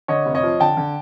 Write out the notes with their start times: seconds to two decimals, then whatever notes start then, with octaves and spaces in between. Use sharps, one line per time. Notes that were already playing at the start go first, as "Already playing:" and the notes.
0.08 D3 C#5 D#5
0.26 F1
0.35 C#5 D#5
0.43 F3
0.60 D3 G5 A5
0.77 D3